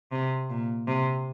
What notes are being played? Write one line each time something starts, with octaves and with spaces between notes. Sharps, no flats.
C3
A#2
C3